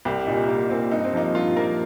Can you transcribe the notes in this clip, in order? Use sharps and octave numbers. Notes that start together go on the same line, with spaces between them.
C2 G4
A#2 G3 D#4
C2 A#3
A#2 G3 C4
G2 D#4
C4
F3 A#3 D#4
G2 F4
F3 A#3 A#4